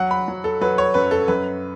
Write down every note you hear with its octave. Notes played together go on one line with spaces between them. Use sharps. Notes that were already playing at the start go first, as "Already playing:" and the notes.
Already playing: F#3 F#5
B5
F#3
A4
F#3 B4
C#5
F#2 B4
A4
F#2 B4